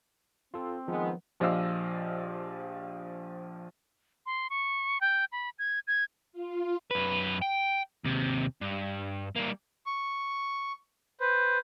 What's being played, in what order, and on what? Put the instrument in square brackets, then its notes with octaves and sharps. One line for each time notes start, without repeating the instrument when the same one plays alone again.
[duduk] C4 [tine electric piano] F4 A4
[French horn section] D#3 B3 [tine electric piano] F3 [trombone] G#3
[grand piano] A#1 F3 G4 D#5 F5 E6
[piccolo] C6
C#6
G5
B5
G#6
G#6
[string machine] F4
[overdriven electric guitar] F#2 B4
G5
D#2 C3
G2
G3 A#3
[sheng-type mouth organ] C#6
B4 C5